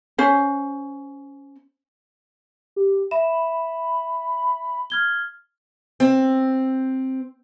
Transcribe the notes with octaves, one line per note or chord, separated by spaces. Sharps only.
C#4 C5
G4
E5 B5 E7
F6 G#6 G7
C4